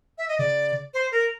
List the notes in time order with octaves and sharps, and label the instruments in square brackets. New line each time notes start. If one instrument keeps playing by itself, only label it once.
[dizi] E5
D#5
[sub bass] C#3 [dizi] D5
[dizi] C5
A#4